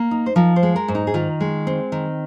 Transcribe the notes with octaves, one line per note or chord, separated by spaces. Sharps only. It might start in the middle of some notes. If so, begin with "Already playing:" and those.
Already playing: A#3
D#4
C5
F3 A#4
C5
G#3
A#4
G#2
D#4
G#4
D#3 F4
G#3
C4
D#3